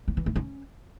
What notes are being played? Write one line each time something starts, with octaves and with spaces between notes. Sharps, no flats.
B3
E3
A#3
C#4